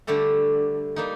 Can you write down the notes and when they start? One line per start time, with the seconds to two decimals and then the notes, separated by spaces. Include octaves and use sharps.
0.07 D3 G3 A3 G4 A4
0.96 G3 A#3 D#4